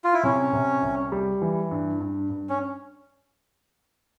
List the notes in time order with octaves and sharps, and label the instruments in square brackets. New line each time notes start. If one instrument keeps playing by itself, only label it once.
[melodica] F4
E4
[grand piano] C3 [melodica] C#4
[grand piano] C3
C2
G3
E3
G2
G2
G2
[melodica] C#4